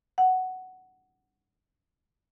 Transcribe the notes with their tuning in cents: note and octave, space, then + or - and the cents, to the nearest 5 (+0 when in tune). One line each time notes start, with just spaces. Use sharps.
F#5 +5